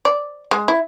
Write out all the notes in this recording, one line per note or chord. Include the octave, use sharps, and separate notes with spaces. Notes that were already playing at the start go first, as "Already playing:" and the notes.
D5
G#3
E4